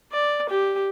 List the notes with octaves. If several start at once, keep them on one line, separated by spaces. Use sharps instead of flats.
D5
G4